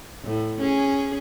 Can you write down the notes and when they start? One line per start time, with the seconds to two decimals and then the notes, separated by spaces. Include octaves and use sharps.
0.24 A2
0.61 C#4 G#4